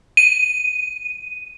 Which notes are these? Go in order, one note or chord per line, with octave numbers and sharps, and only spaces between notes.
D#7